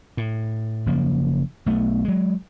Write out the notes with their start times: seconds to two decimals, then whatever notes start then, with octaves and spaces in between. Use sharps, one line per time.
0.17 A2
0.86 F#1 C#3 F3 A#3
1.66 B1 A3 B3
2.05 F#3 G#3